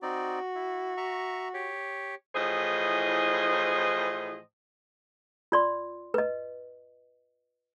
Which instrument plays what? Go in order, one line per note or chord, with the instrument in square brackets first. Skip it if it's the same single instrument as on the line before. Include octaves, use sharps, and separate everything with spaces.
[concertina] C4 D#4 D5 [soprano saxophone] F#4
[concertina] E4
E5 A#5 C#6
G4 C#5
[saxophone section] A2 E3 F3 G#4 C5 D#5
[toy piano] F4 D5 C6
B4 D#5